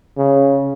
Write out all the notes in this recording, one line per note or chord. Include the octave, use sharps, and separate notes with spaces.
C#3